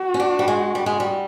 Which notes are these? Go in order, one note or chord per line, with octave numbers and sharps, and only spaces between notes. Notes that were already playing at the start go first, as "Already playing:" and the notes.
Already playing: F#4
C#4
D4
G3
G#3
G3
G#3
G3